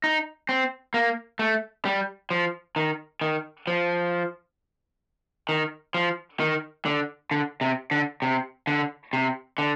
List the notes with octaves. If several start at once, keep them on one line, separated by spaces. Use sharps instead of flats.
D#4
C4
A#3
A3
G3
F3
D#3
D#3
F3
D#3
F3
D#3
D3
D3
C3
D3
C3
D3
C3
D3